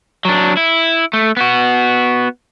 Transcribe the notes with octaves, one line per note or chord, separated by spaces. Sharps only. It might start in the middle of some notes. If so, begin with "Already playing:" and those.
F#3 D4
E4
A3
B3 F#4